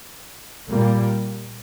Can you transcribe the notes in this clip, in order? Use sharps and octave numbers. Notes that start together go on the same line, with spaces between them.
A#2 G3 A#3